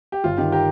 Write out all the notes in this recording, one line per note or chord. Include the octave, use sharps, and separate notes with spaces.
G4
G1 F4
D#3 G4
G4 A#4